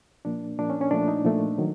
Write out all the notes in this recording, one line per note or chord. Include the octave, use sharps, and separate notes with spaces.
A#2 F3 A#3 D4
A#2 F3 A#3 D4
C#4
C#4
A#2 F3 A3 D4
D#4
A#2 F3 A3
D#3 F#3